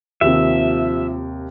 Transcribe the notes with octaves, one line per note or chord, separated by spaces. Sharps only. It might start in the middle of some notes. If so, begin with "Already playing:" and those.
D#2 C3 F3 E5